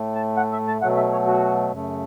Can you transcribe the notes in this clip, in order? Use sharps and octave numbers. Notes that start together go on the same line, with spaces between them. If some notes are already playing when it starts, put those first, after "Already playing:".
Already playing: A2 A3
A5
F#5
E5
A5
B2 F#3 A3 F#5
E5
C#5
F#4
F#2 C#3 A3